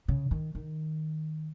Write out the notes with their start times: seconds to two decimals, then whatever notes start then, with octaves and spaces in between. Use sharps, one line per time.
0.08 C#3
0.31 D#3
0.55 D#3